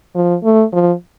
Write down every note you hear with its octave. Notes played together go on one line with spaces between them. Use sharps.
F3
A3
F3